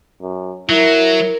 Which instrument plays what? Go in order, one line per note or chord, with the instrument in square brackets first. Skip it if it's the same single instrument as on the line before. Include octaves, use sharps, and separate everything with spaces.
[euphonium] F#2
[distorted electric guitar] F#3 [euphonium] E4 [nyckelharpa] A#4